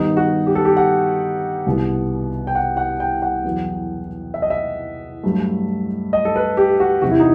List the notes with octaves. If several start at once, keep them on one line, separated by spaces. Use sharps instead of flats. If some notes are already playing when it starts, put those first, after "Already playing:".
Already playing: G2 D#3 G3 B3 D#4
F#4
G4
A4
G4
F#5
C2 B2 G3 B3
G5
F#5
F#5
G5
F#5
E2 B2 F#3 B3
E5
D#5
E5
G2 F#3 A3
D#5
A4
B4
G4
F#4
E2 C3 E3 F#4
E4
D#4